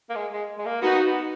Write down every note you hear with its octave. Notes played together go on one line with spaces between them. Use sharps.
A#3
G#3
G#3
G#3
A#3
B3 D#4 F#4
B3